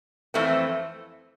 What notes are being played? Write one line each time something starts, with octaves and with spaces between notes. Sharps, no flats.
F2 E3 A3 C4